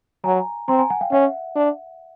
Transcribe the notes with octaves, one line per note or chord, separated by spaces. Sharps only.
F#3 G#5 A#5
C4 A#5 C6
G#5 A#5
F#5 G#5
F5 G5
C#4 E5 F#5
D4